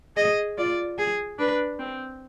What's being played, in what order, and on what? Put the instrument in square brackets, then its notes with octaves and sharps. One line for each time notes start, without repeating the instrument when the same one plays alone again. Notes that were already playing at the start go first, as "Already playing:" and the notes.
[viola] G#4 [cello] D#5
[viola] F4 [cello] D5
[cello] G#4
[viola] D4 [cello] B4
[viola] C4